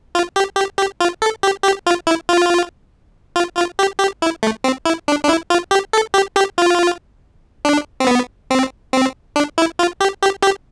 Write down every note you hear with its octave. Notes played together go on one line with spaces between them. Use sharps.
F4
G4
G4
G4
F4
A4
G4
G4
F4
E4
F4
F4
F4
G4
G4
E4
A3
C4
E4
D4
D4
E4
F4
G4
A4
G4
G4
F4
D4
C4
B3
C4
C4
D4
E4
F4
G4
G4
G4